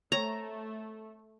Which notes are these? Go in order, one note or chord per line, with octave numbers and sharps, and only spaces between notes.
A3 C4 C#5 A#5